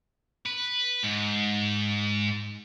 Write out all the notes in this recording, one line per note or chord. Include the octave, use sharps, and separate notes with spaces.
B4
G#2